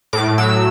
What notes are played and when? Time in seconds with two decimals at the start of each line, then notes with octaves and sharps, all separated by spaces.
0.13 A2 D6
0.38 F#3 E6